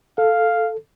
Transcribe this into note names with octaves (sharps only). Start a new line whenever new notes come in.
A4 F5